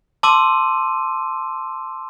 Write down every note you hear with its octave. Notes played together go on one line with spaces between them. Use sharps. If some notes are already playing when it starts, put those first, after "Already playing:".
A5 C6 D6 E6 D#7